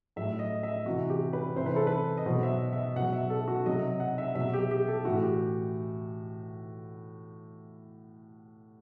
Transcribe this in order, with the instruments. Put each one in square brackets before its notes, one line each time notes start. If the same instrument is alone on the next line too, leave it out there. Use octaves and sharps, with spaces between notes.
[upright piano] A2 F#3 E5
D#5
E5
C3 E3 F#4
G4
B4
C3 E3 C5
B4
A4
B4
D#5
B2 F#3 C5
E5
D#5
E5
B2 F#3 F#5
E5
A4
F#4
C3 F#3 D#5
F#5
E5
B2 F#3 E5
G4
G4
A4
A2 E3 F#4
G4